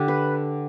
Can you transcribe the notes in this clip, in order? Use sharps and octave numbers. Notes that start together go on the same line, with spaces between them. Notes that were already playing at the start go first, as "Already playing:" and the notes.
Already playing: D3 G4
B4